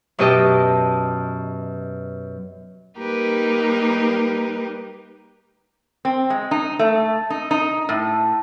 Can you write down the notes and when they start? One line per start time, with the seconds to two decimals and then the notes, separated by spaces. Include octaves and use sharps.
0.19 F#2 B2 G4 D#5 G5 A5
2.98 G3 A#3 D#4 G4 A#4 B4
6.05 C4
6.30 G#3
6.51 D#4
6.79 A3
7.30 D#4
7.51 D#4
7.89 A2